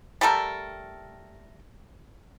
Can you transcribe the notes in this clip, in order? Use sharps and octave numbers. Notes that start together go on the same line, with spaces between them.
G3 A3 A4 A#4